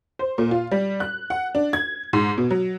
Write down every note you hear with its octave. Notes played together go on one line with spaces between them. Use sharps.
C5
A#2
F4
G3
F#6
F#5
D4
G#6
G#2
B2
F#3